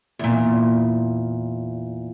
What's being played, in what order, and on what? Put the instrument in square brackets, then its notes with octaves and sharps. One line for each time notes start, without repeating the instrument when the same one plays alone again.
[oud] E2 A#2